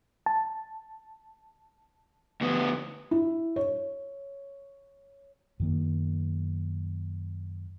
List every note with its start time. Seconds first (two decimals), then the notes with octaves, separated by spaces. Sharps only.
0.26 A5
2.41 D2 B3
3.11 E4
3.56 C#5
5.60 F#2 D#3 A#3